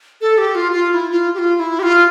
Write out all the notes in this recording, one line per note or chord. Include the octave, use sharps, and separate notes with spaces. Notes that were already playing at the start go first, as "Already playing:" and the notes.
A4
G4
F4
F4
F4
E4
F4
G4
F4
F4
E4
G4
F4